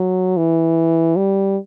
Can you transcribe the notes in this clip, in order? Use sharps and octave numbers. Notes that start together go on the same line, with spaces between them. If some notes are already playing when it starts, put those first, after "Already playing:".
Already playing: F#3
E3
G3